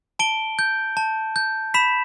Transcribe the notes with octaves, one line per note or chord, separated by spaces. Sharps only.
A5 D7 G7
G6
A5
G6
B5 B6 E7